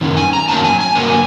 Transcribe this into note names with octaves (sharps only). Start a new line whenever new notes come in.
F#2 D#3 C#4
G#5
A#5
F#2 D#3 F#3 A#3 C#4 A5
G#5
G#5
G2 D3 F#3 A#3